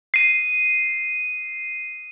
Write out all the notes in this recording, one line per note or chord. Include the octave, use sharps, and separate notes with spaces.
C7 D#7